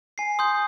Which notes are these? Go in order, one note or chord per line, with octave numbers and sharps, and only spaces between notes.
G#5 C7
C6 D#6 G6